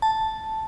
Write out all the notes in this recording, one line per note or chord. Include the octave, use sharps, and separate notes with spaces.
A5